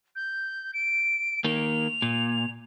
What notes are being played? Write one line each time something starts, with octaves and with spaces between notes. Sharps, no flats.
G6
D7
D#3 A#3 F7
A#2